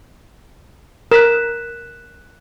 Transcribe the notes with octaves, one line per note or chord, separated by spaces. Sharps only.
A#4 F#6 B6 E7